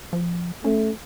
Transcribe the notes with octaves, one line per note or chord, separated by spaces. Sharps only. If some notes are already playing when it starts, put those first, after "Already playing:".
F3
A3 C#4